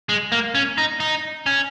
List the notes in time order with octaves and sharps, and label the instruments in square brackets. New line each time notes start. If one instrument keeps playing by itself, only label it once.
[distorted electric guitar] G#3
A#3
C#4
D#4
D#4
C#4